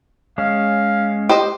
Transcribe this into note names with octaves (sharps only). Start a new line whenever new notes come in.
G#3 C#4 F5
G4 C5 D#5